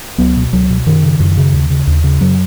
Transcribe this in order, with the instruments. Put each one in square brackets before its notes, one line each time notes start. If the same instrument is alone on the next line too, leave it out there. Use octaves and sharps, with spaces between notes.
[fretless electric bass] C#2 F#3 B3
B2
C#2 F#3
B2
F#2 D#3
C#3
F#2
C#3
D#2
C#3
D#2
C#3
F#2 F#3